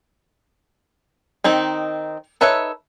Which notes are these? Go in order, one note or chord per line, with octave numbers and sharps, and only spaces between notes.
D#3 C4 D#4
D#4 A4 B4 C#5 E5